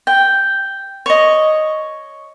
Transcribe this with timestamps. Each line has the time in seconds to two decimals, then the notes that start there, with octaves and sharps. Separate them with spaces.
0.07 G5
1.06 C#5 D#5